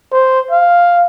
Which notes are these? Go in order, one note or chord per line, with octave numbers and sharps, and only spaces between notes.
C5
F5